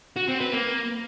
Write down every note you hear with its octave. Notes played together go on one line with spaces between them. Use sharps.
F#4
C4
B4
A#3